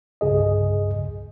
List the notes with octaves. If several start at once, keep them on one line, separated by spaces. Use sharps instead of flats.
C2 G2 C#3 G#4 D#5